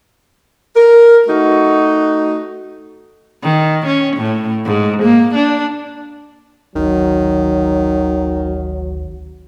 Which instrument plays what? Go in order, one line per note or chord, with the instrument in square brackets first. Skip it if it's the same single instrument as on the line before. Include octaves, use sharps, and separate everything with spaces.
[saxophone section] A#4
A3 D#4 F#4
[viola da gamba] D#3
C#4
A2
G#2
A#3
D4
[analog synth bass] G#1 [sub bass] D2 [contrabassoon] D#3 [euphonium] F#3